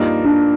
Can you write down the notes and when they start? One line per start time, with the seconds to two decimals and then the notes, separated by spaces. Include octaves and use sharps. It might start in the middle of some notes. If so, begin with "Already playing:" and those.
Already playing: G2 F3 A#3 D#4
0.24 D4